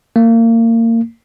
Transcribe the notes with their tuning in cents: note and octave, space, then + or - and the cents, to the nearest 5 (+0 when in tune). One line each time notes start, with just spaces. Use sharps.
A#3 -30